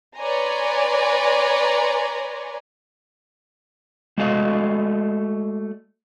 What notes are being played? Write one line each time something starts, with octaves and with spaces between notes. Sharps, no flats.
B4 C#5 D5 G#5 A#5 C6
G#3 A3 F#4 D5 D#5 F5